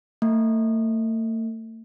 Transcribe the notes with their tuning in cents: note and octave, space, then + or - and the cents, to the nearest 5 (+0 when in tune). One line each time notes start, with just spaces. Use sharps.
A3 +40